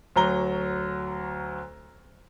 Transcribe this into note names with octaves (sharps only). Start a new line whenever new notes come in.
D2 F#3 A#5 G7